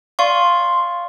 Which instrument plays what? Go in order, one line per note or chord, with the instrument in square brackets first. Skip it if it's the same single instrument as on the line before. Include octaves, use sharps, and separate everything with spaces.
[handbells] D5 F5 C#6 [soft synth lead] C6